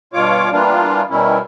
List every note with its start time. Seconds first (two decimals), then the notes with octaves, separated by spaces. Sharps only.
0.13 G2 B2 F4 C#5 D6
0.52 E3 G3 A#3 B3 D4 F4
1.10 B2 D#3 G3 C#4 E4